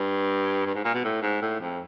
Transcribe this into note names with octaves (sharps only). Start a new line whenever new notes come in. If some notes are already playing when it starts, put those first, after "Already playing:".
Already playing: G2
G2
G#2
A#2
B2
A2
G#2
A2
F2